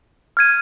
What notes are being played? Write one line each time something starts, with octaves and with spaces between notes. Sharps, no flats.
F6 G#6 D#7